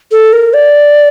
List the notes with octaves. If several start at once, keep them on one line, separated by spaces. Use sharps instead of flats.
A4
A#4
D5